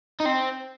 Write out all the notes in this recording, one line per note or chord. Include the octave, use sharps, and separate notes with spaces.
D#4
C4